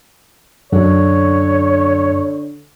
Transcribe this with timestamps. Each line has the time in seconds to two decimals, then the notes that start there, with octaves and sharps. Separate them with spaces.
0.72 F#2 D3 C#5